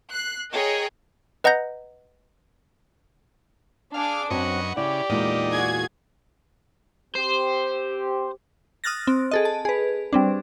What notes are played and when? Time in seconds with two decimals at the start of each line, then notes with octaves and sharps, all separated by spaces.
0.12 F#6 C7
0.51 G#4 A#4 C#5 D#5 G5
1.44 B4 D#5 F#5 A#5 G6 A#6
3.94 D4 G#4 F5 D6
4.30 F#2 F#3 C4 B4 D#5 F#5 C#6
4.77 C#3 E4 G4 D5
5.10 E2 A#2 G#3 D#4
5.51 F#4 G#4 G#6
7.15 C4 G4 C5
8.84 D#6 F6 F#6 A6 A#6
9.07 C4
9.31 G#4 A4 D#5
9.45 A5
9.65 G#4 B4
10.13 G3 C4 D4